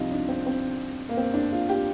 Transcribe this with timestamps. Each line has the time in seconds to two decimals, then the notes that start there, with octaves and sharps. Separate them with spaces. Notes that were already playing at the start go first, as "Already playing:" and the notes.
Already playing: C2 C3 F3 D#4 F4
0.11 D4
0.28 C4
0.46 C4
1.09 A#3
1.17 C4
1.34 D4
1.52 F4
1.69 G4